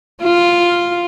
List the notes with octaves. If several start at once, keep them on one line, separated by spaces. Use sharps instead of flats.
F4